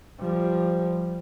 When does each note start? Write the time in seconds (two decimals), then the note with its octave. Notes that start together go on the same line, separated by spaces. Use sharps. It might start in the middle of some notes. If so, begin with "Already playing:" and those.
0.20 F3 G3